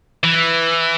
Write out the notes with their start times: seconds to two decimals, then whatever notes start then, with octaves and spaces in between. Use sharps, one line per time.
0.24 E3